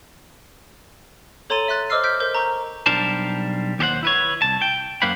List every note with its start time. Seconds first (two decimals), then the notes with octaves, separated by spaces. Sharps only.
1.50 A4 C#5 A#5 C6 A6 D#7
1.68 E5 C6 F#6 A6
1.90 C5 D#5 D6 E6 F6 C7
2.03 F6 G6 B6 D7
2.20 A#4 C5 G6
2.35 A#5 C#6
2.86 B1 G3 D4 A#4 C5 A5
3.79 D#2 G4 A4 C5 F#5
4.03 E4 B4 C#5
4.42 C2 A5
4.62 G5
5.02 F#2 A#3 C5 F5 F#5 B5